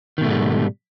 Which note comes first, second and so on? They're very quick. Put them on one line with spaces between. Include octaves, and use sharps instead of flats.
D#3 B2 A3 G#2 G3